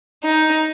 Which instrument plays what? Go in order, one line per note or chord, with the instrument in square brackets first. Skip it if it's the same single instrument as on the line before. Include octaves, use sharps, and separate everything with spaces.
[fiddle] D#4